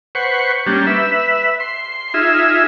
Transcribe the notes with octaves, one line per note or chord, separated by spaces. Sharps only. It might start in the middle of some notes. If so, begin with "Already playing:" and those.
B4 C5 F#5 C#6
G3 A#3 C#4 D4 G4
B4 E5
C6
D#4 F4 G#4 E5